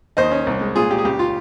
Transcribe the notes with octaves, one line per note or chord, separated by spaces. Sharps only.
D#2 C5 D#5
C#4
C2
G#3
A#2 F4 G#4
A#2 G4
G#4
C#2 G4
F4